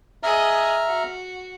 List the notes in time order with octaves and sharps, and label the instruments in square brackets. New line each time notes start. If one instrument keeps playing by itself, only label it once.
[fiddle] G#4 D#5 [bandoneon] E5 A#5 F6
[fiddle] F#4